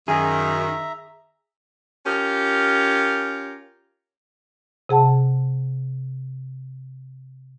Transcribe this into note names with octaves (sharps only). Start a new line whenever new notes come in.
F#2 D#3 G#4 E5 A#5
C#4 F4 G4 A#4
C3 G#4 F#5 A5